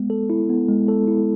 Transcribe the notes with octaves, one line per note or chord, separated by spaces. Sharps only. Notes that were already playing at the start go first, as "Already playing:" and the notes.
Already playing: G#3 B3
A4
E4
B3
G#3
A4
E4